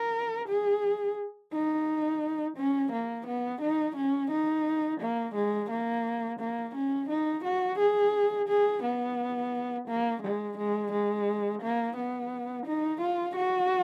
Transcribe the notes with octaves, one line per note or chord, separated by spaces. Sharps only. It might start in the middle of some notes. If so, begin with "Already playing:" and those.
Already playing: A#4
G#4
D#4
C#4
A#3
B3
D#4
C#4
D#4
A#3
G#3
A#3
A#3
C#4
D#4
F#4
G#4
G#4
B3
A#3
G#3
G#3
G#3
A#3
B3
D#4
F4
F#4